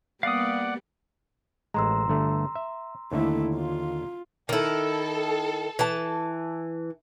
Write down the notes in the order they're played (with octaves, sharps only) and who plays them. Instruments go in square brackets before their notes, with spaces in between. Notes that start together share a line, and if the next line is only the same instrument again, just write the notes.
[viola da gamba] G3 A#3 B3 [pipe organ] D5 F#5 [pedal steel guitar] F5 D#6
[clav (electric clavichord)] A1 G#3 [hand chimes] A#5 C6 E6
[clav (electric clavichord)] G1 D3 A3
E5
[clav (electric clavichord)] D#2 D3 E5 [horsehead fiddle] A3 E4
[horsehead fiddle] F4
[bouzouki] D#3 E4 [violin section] A4
[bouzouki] E3 A5